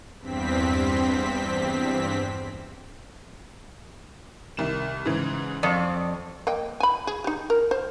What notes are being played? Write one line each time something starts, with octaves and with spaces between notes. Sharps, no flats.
E2 G2 C4 B6
C2 D#3 E7
G#2 C#3 E3
F2 D5 C#6
A#3 D#5 G5
G#5 B5
G#4
D#4 G4
A#4
C5